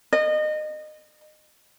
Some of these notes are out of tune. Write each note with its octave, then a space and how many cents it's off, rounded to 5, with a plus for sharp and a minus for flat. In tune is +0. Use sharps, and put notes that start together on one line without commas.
D#5 -30